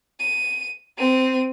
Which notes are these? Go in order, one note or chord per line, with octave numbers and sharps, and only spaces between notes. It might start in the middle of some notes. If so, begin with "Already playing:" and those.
D#7
C4 D#7